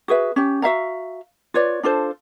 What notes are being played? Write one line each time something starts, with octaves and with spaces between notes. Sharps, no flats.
F#4 G#4 B4 E5
C#4 G4
F#4 E5 F5 A#5
F4 B4 C#5 D5
D4 F4 A4 C5